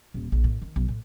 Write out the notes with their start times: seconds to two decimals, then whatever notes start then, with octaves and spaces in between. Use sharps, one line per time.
0.14 D#1
0.32 A#1
0.44 A2
0.62 D#3
0.76 B1
0.88 A2